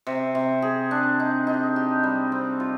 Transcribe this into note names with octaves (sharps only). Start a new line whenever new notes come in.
C3
C3
G#4
D4
D#4
D#4
G4
G3
C4
F4